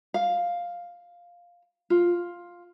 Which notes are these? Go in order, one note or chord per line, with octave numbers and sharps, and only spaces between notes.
F5
F4